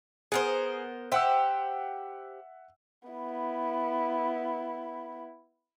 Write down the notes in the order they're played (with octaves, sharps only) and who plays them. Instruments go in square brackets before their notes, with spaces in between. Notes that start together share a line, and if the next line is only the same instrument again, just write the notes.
[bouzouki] B3 A#4 C5 [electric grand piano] G#4
[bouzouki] G4 C5 [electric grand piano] E5 F#5 E6
[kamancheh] B3 E4